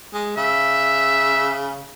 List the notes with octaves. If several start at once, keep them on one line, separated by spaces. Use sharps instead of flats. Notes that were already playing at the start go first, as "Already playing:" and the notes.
G#3
C#3 E5